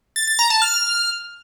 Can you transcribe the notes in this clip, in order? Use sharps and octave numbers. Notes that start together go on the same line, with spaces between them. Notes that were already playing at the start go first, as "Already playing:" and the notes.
A6
A6
A#5
A5
F6